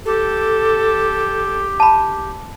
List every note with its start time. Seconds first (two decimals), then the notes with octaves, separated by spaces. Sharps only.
0.06 G4 A4
1.80 A5 B5